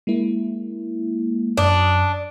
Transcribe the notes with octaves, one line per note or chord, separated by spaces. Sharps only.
G#3 A#3 E4
F#2 D4 D#6